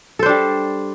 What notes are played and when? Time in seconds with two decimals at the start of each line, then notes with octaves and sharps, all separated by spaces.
0.19 A4
0.23 C5
0.26 D4
0.29 G3